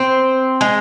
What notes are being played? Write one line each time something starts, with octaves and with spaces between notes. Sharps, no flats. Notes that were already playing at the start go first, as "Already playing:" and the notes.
Already playing: C4
G#3